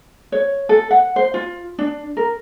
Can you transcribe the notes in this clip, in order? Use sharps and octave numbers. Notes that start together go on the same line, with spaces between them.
C#5
A4
F#5
C5
F4
D4
A#4